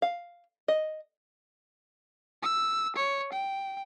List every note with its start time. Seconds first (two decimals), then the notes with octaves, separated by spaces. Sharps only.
0.02 F5
0.68 D#5
2.42 E6
2.96 C#5
3.32 G5